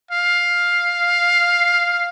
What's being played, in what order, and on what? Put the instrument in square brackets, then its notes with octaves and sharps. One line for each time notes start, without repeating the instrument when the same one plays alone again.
[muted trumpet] F5